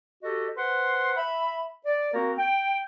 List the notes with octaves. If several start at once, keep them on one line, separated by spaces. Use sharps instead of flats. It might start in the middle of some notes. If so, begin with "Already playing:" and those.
F#4 G4 A4 D#5
B4 C5 F#5 C6
E5 B5
D5
A#3 C4 F#4 A#4
G5